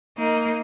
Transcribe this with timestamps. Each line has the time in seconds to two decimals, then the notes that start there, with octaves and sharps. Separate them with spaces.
0.17 A#3 D#4